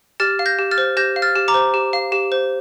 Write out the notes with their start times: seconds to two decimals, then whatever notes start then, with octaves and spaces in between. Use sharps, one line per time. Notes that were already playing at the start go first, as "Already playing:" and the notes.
0.20 G4 F6 A6
0.39 F5
0.46 G6 A#6
0.59 G4
0.71 F6 A6
0.78 C5
0.97 G4 G6 A#6
1.16 F5
1.22 F6 A6
1.36 G4
1.48 A#5 D6
1.54 C5
1.74 G4
1.93 F5
2.12 G4
2.32 C5